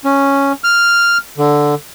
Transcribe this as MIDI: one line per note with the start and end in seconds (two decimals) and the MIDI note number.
0.05 0.53 61
0.64 1.18 89
1.38 1.75 50